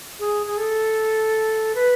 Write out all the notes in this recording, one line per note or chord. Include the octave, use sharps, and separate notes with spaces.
G#4
G#4
A4
B4